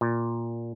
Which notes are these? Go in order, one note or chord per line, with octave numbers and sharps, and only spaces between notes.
A#2